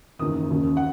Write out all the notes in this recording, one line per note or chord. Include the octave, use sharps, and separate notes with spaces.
F#1 E2 D#3 D#6
E1 D#2 C#3
F#5